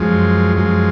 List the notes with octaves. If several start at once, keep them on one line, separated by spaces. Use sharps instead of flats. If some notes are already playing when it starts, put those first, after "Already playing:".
Already playing: F#2 F3 G#3
F#2 F3 G#3